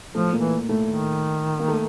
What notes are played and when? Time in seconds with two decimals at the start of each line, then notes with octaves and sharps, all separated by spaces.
0.14 A2 F3 A3
0.32 A#2 A#3
0.39 E3
0.69 A2 A3
0.87 D#3
1.59 A#3
1.68 A3